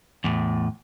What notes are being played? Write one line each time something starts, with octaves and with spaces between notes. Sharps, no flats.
E2 A2